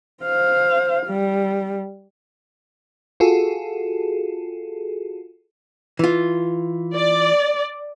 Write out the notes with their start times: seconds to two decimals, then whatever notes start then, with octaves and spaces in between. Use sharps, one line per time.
0.24 C5 F5
1.07 G3
3.20 F4 F#4 G#4 A4
5.99 E3 F4
6.95 D5